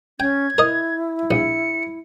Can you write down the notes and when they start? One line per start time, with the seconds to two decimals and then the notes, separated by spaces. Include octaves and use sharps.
0.20 C#4 G5 G#6
0.58 E4 A#4 D#5
1.31 A#1 C#7